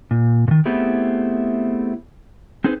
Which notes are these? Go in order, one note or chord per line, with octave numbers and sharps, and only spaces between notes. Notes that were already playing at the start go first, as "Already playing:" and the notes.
A#2
A#2 D#3
A3 B3 C4 E4 G4 G#4
C4 D#4 G#4 B4 C5